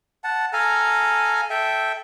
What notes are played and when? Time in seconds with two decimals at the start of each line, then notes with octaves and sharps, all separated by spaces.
0.24 F#5 A5
0.53 A4 F5 G#5 A#5
1.50 A4 E5 G5